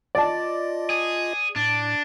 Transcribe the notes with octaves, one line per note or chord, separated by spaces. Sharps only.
F4 D5 D#5 A5
G#4
A2 D4